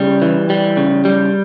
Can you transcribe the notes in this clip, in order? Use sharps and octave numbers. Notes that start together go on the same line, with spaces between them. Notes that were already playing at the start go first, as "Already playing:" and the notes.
Already playing: C#3 G3
E3
G3
C#3
G3